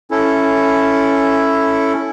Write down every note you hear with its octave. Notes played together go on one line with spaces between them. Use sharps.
C#4 E4 A4